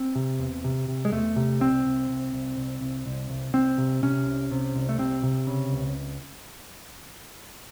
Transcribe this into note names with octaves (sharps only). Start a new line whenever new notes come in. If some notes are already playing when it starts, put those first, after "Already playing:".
Already playing: C4
C3
E2
C3
C3
G#3
E2 A3
C3
C2 C4
C2
C2
C2
C2
C2
C2
C2
C2 C4
C3
C3 C#4
C2
C3
C2
A3
C3 C4
C3
C#3
C#2